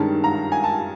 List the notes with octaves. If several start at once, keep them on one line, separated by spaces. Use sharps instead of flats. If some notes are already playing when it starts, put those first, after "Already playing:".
Already playing: G2 D#3 G#3 C#4 A5
A#5
G#5
A5